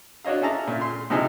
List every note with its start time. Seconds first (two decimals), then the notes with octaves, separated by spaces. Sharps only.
0.24 D4 F#4 C#5 D#5 F5
0.42 C#4 E4 G#4 A5 A#5
0.67 A#2 A3
0.81 C6
1.10 A2 C3 F3 D#4 G#4